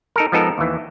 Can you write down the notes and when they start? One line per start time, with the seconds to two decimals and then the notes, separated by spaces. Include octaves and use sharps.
0.16 D#4 A4 A#4
0.32 F3 G#3 B3 D#4 A4 A#4
0.58 D#2 E3